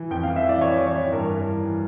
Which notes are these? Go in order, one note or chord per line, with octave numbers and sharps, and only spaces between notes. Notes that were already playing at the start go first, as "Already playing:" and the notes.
Already playing: E3
F2 G5
E3 F5
E5
E3 D5
E3 C#5
E3
C#5
E3
G2 A#4
E3
E3
E3